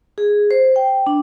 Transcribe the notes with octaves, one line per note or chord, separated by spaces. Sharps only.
G#4
C5
G5
D4